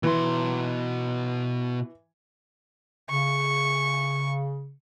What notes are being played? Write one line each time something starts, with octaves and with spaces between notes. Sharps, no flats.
B2 E3 C6
C#3 C#6